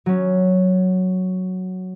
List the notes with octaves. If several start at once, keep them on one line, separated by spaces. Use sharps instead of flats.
F#3 C#4